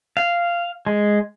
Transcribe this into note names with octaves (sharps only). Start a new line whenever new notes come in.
F5
G#3